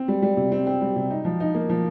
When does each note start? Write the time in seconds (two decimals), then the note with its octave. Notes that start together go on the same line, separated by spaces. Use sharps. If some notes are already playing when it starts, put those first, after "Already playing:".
Already playing: C4
0.08 G3
0.22 G3
0.37 C3
0.52 C4
0.67 C4
0.81 G3
0.96 C3
1.10 D#4
1.25 F3
1.40 D#4
1.54 A#3
1.70 F3